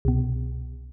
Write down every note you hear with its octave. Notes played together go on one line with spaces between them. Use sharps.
C2 B2